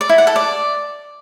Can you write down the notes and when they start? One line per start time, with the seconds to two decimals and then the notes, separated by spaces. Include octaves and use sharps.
0.01 D5
0.09 E4
0.18 F#5
0.27 A4
0.36 D5